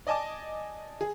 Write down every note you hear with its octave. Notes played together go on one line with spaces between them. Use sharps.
D5 D#5 G#5 A5 D6
G#4